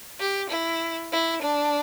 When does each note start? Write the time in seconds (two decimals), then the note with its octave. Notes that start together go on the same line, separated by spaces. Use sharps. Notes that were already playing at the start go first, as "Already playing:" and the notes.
0.20 G4
0.50 E4
1.12 E4
1.42 D4